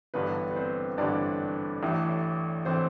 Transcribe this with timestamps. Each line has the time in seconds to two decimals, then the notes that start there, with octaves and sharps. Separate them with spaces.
0.14 A1 G2 D3 B3 B4
0.51 B4
0.56 C4 C5
0.98 A1 G2 D3 D4 D5
1.83 A1 A2 E3
2.65 A2 E3 C4 C5